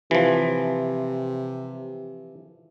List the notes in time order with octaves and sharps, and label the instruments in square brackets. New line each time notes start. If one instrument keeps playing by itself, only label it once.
[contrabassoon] C3 [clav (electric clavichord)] E3 F3